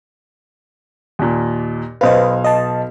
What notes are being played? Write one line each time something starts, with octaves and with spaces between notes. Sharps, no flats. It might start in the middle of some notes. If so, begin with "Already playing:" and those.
D#2 A#2
B1 B4 C5 D#5 F5
D#5 A5